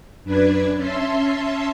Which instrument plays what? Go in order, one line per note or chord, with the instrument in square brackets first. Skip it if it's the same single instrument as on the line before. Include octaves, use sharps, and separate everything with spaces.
[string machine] F#2 D4 B4 G#6
C#4 E5 A5 C6